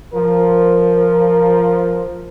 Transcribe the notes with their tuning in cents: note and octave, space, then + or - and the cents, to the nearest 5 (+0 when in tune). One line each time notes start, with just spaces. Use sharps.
F3 +0 A#4 +0